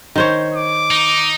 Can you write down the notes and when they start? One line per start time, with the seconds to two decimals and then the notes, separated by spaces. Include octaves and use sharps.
0.16 D#3 C5 C#5
0.54 D6
0.91 D#4